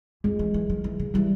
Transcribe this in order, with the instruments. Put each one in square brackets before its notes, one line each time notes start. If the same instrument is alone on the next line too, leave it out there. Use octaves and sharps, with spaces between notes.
[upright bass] F2 [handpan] G#3
[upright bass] E3
E3
F3
E3
C#3
[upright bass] E3 [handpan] G3